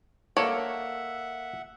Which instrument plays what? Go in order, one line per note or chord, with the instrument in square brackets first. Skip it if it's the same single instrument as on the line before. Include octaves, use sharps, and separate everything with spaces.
[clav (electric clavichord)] A#3 A4 D5 [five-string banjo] C#5 [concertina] E5 F#5